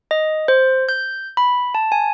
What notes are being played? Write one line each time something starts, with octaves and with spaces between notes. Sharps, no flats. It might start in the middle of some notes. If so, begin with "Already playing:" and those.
D#5
C5
G6
B5
A5
G#5